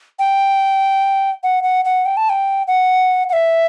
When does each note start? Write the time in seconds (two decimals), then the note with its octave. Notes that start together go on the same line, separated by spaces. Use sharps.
0.19 G5
1.43 F#5
1.63 F#5
1.85 F#5
2.06 G5
2.17 A5
2.30 G5
2.68 F#5
3.29 F#5
3.33 E5